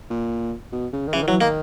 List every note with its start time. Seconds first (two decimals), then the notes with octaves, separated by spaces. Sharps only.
0.10 A#2
0.72 B2
0.93 C#3
1.08 D#3
1.13 C#3 E3
1.23 D#3
1.27 E3 F#3
1.41 D#3 A#3